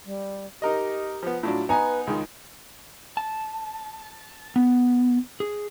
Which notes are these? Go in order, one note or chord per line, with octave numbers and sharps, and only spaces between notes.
G3
D#4 G4 A#4 D#5
F3 B3
A2 F#3 D4 F4
B3 D#4 B4 G#5 A#5
C#2 D#3 G#3
A5
B3
G#4